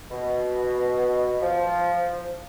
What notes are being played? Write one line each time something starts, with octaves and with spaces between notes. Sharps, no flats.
B2
F3